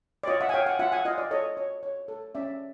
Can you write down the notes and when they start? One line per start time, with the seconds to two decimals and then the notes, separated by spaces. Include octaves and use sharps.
0.23 D5
0.27 F4 C#5 D#5
0.41 E5 F#5
0.49 G#5
0.54 C#5 F5 G5
0.66 F#5 G#5
0.79 F4 E5 F#5
0.92 F#5 G#5
1.05 F4 D#5 F5
1.18 D5
1.31 A4 C#5 D#5
1.57 C#5
1.83 C#5
2.08 A4
2.35 C#4 D5 E5